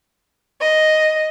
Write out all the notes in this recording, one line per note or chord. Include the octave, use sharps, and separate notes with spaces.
D#5